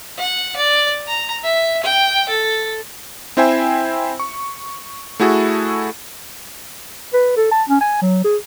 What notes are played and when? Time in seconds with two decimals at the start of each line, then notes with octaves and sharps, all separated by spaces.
0.18 F#5
0.56 D5
1.08 A#5
1.44 E5
1.83 G5
2.29 A4
3.37 C4 E4 C5 E5 G5 G#5
4.20 C#6
5.20 A3 E4 F#4 G#4 A4
7.13 B4
7.37 A4
7.51 A5
7.69 C#4
7.81 G#5
8.01 F#3
8.24 G#4